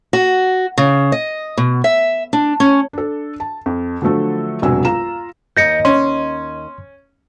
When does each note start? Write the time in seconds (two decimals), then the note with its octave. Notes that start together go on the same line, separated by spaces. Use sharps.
0.13 F#4
0.78 C#3
1.12 D#5
1.58 B2
1.84 E5
2.33 D4
2.60 C#4
2.93 D4 A4
3.40 A5
3.66 F2
4.02 D3 F3 F#3 A3 A4
4.62 E1 C2 G2 F#3 G#5 E6
4.85 F4 A#5 E7
5.57 D#2 D#5 G6 A#6 C#7
5.85 C#4 C6